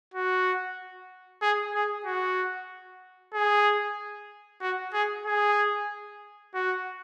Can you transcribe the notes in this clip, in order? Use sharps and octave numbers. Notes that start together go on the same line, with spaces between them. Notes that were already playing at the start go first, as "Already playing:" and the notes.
F#4
G#4
G#4
F#4
G#4
F#4
G#4
G#4
F#4